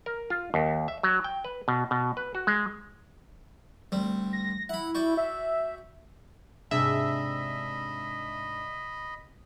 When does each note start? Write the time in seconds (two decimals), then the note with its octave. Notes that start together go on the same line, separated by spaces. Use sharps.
0.06 A#4
0.30 F4
0.54 D#2
0.88 E5
1.03 F#3
1.24 G5
1.44 B4
1.68 B2
1.91 B2
2.17 B4
2.35 F#4
2.47 G#3
3.92 D2 G3 C4
4.33 A#6
4.69 E4 F#5 B5
4.95 F#4 D5 G5
5.17 E5
6.71 G#2 C3 D4 G#4 D#5 E5 B5 E6